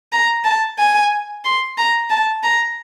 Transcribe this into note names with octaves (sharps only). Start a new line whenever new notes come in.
A#5
A5
G#5
C6
A#5
A5
A#5